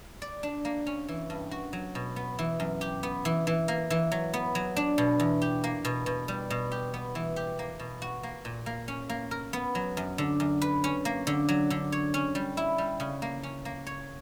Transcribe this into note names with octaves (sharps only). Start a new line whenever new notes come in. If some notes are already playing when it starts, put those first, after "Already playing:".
D5
D4
A#3
C#4
E3
G2
F#4
F#3
B2
B3
E3
F#2
G4
B3
E3
E3
A#3
E3
F#3
B3
F#3
D4
B2
E2
G4
A#3
B2
B2
G3
B2
G4
B3
E3
G4
A#3
B2
F#4
A#3
A#2
A#3
C#4
A#3
A#4
B3
F#3
F#2
D3
F#2
B4
C#4
A#3
D3
F#3
D3
C#5
C#4
G3
E4
G3
C#3
A#3
C#4
A#3
C#5